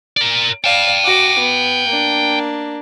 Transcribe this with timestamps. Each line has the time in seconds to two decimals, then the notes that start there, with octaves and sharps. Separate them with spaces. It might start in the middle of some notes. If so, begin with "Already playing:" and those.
0.17 A#4 D5
0.64 D5 F5 G5 A5
1.04 F#4 D6
1.39 B3
1.88 A#3 D4